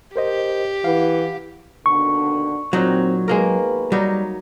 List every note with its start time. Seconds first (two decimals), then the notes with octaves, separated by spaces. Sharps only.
0.16 G4 A#4 C5 D#5
0.84 E3 F5 F#5
1.86 D#2 B2 D3 C#6
2.73 A#2 F#3 C4 D#4 F#4
3.28 D#2 B2 G#3 A#3 A#4 B4
3.92 F#3 G3 D#4